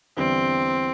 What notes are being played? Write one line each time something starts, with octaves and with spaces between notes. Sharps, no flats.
E2 D3 G3 B3 C4 E4